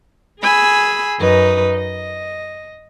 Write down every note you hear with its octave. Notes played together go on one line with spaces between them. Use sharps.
G#4 G#5 B5 E6
F#2 D#4 B4 D#5
D#5